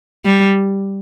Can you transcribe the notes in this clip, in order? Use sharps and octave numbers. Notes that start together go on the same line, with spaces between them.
G3